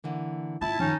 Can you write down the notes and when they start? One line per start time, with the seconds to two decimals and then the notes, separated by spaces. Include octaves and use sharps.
0.04 D3 E3 A#3
0.61 G#1 E4 F4 A5
0.79 F#2 D#3 F3 C#4 D#4